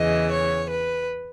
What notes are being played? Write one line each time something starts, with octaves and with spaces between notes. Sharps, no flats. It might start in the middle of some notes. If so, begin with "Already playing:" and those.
Already playing: E2 C#3 E3 D#5
C#5
B4